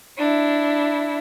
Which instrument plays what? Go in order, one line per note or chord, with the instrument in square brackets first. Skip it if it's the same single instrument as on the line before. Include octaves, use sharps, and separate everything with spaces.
[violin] D4 E4